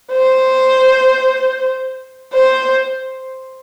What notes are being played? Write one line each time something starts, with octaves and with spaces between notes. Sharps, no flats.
C5
C5